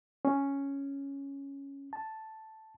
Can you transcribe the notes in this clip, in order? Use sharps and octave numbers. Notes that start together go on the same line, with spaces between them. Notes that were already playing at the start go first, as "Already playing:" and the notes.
C#4
A5